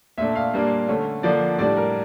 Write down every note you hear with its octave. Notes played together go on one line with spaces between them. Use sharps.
A#2 A3 D4 E5
F5
A#2 G3 A#3 D4
D3 A3 C#4
D3 F3 A#3 D4 D5
A2 G3 D4 D5
A#4